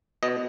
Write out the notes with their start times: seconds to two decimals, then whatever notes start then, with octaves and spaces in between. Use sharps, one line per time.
0.23 B2 D#5